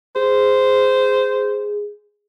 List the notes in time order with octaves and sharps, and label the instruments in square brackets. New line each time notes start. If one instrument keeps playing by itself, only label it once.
[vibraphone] G#4 [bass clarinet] C5